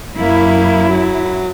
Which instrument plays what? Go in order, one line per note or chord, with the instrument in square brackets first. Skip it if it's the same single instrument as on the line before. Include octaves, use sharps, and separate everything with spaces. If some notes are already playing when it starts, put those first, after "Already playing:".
[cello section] F#2 E4 [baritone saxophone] A#3
[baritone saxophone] F#3